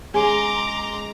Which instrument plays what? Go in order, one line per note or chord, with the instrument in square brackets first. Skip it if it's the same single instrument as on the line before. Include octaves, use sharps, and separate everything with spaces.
[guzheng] G#3 B3 C#4 [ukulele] G#4 [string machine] A#5 [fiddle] C6 D6